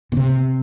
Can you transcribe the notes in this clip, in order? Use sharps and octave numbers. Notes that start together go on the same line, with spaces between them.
B2
C3